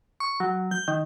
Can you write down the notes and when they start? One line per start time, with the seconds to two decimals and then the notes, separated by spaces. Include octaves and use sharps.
0.20 C#6
0.40 F#3
0.71 G6
0.88 D#3